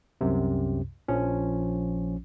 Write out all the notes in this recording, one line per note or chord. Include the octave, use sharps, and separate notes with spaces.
C2 F#2 C3
A#1 F3 C#4